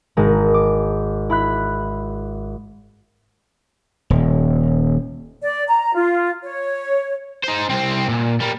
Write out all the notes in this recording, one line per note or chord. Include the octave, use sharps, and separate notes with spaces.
G#1 G#3 A#4
D6
E4 B5 F#6 B6
D#1
D5
A#5
F4
C#5
D#4 C5
C2 C4
A#2
G3 A#3